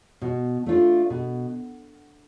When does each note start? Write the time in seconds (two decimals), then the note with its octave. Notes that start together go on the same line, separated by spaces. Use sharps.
0.22 B2
0.66 A3 D4 F4
1.10 B2